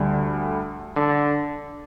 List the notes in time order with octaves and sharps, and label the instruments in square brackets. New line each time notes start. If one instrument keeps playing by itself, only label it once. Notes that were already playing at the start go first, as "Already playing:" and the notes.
Already playing: [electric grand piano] D2 D3 G3
[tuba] D3